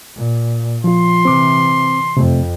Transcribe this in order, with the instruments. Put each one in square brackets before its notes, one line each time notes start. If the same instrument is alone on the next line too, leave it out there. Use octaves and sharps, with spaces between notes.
[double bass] A#2
[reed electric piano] F3 F4 [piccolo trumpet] C6
[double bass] C3 E3 [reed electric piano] C4 D6
[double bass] F2 [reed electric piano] C3 A3 C4